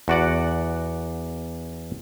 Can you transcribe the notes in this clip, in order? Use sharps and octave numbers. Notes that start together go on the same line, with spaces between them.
E2 F#4 D5 F#5